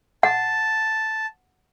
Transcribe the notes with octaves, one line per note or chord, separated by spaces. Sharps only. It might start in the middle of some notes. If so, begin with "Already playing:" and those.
F#5 A5